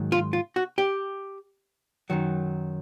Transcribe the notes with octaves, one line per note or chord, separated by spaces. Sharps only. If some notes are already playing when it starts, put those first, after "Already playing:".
Already playing: G#2 D#3 F#3
F4
F4
F#4
G4
F#2 D#3 F#3